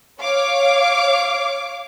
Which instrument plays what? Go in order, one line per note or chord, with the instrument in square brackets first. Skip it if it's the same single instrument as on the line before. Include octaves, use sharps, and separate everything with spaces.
[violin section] C#5 F5 D6